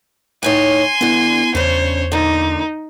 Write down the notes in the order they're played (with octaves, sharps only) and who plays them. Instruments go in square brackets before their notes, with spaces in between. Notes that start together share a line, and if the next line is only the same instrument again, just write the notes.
[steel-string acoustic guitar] A2 D#4 C#5 [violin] G#5 C6
[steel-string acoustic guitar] G2 D3 [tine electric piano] B3 E4
[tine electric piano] E2 [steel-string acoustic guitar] C#3 D4 [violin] C5 C#5
[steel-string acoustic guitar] A#2 D3 [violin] D#4